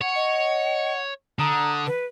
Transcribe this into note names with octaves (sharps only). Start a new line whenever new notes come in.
C#5 F#5
D#5
D3 A#5 D#6
B4